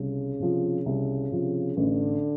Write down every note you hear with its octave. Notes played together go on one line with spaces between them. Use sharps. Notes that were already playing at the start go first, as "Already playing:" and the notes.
Already playing: C2 C#3
C3 F3
C2
C3 F3
A1 D3